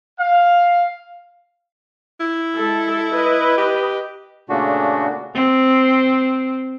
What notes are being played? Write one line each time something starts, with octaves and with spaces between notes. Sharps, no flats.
F5
E4
G#3 A4 E5
B4 D#5
G4
A#2 C#3 A3 D4 F#4
C4